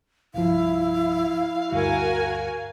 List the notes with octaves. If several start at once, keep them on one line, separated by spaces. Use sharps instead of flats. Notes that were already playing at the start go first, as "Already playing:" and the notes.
C2 G2 F3 E4 F5
D2 G2 F#4 A#4 G#5